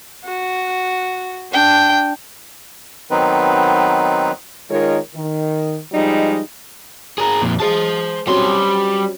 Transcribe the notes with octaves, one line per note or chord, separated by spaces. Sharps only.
F#4
D4 G5
D#3 F#3 B3 C4 D#4 B4
D#3 G#3 F4 A#4 C#5
D#3
F3 G3 G#3 D#4
G#4 A#4
F2 A#2
G#3 G#4 C5 A5
F#3 G3 C4 C#4 C6